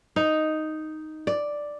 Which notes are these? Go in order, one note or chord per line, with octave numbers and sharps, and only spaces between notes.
D#4
D5